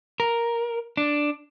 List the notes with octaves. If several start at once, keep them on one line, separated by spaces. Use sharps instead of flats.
A#4
D4